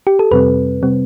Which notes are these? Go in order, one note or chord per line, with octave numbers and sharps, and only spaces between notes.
G4
A4
F2 C3 G3 C4 B4
C3 G3 C4